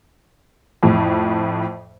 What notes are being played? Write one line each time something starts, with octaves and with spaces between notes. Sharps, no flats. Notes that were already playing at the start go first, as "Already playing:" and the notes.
F2 A2